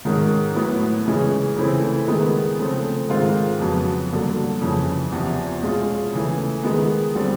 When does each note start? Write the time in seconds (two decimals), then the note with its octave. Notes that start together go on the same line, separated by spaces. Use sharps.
0.05 G#2 D#3 G#3 C#4
0.55 A2 F#3 B3 E4
1.05 C#3 E3 G#3 C#4
1.57 C#3 E3 A3 C4 E4
2.07 D#3 G#3 B3
2.59 C#3 F3 A3 C4
3.09 G#2 D#3 G#3 C4 F4
3.60 F2 C#3 F#3 B3
4.10 G2 D3 F#3 A#3
4.61 F2 C#3 E3
5.12 E2 C3 F3
5.62 B2 G#3 C#4 F4
6.13 C#3 E3 A3
6.63 D#3 G#3 B3
7.15 D3 G3 C4